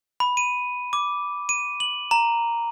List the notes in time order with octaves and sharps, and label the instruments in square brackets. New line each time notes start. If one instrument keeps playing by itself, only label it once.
[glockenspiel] B5
D#7
D6
D#7
F#7
A#5